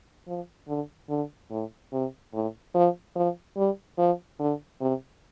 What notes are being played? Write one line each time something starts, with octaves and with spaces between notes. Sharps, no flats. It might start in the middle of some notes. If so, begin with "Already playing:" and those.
F3
D3
D3
A2
C3
A2
F3
F3
G3
F3
D3
C3